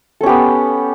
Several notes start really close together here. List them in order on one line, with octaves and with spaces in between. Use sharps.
A4 C#4 G4 B3